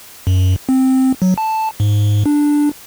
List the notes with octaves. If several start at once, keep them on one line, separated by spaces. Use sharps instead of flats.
F#2
C4
F#3
A5
G#2
D4